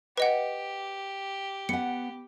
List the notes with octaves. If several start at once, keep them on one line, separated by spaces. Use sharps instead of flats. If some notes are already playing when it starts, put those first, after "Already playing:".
G4 B4 D#5 F#5
B3 F#5 C#7